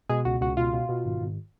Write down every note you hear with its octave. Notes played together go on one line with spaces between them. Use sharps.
B2 G#3 G#4
C#2 F#4
C#2 F#4
B2 F4
B2
B2
G#1
G#1